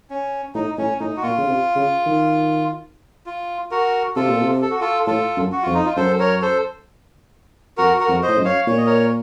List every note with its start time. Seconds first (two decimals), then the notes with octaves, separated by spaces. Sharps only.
0.10 C#4
0.55 A2 D#4
0.78 A2 C#4
1.00 A2 D#4
1.17 F#4
1.22 A#2 F4
1.38 C#3
1.46 C3
1.76 C#3
2.06 D#3
3.26 F4
3.71 F#4 A#4
4.16 C3 F4 A4
4.29 A#2
4.42 C3
4.62 A4
4.71 F#4
4.80 F4 A4
5.06 A2 F4 A4
5.37 F#2
5.52 F#4
5.63 F2 F4
5.74 D#4
5.85 F4
5.96 F#2 A4 C5
6.19 A#4 C#5
6.42 A4 C5
7.77 F2 F#4 A#4
8.00 F#4 A#4
8.08 F2
8.23 A2 C5 D#5
8.38 F#2
8.45 C#5 F5
8.67 A#2 C#5
8.77 D#5
8.86 A#4 C#5